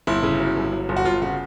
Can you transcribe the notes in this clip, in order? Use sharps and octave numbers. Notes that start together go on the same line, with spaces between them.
G1 E4
C#3
F#3
G1
F#3
G1
F#4
G1 F4
C#3 F#4